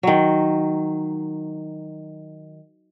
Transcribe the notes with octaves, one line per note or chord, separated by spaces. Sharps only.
D#3 F#3